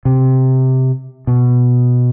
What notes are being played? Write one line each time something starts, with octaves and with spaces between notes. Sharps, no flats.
C3
B2